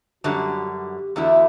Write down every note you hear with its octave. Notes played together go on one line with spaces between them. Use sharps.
F#2 D3 G3 F#4
G4
E2 D3 A3 E4 F#4